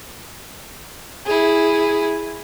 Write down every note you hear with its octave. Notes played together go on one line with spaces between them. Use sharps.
E4 G#4